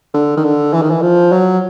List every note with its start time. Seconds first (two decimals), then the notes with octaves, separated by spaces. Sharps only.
0.14 D3
0.37 D#3
0.44 D3
0.74 E3
0.82 D#3
0.91 E3
1.02 F3
1.32 F#3